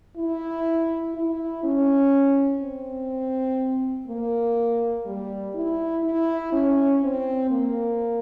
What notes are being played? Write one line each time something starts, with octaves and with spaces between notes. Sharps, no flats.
E4
E4
C#4
C4
A#3
G3
E4
E4
C#4
C4
A#3